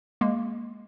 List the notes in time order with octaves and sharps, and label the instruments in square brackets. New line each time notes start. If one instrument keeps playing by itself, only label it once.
[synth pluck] G#3 A#3